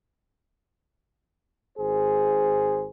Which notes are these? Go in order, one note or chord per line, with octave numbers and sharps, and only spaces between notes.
G#1 G#4 C5